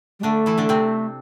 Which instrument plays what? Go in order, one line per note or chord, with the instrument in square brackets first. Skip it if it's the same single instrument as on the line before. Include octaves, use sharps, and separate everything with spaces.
[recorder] G3
[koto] D3 D4 [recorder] A3
[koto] E3 E4
D3 D4
C3 C4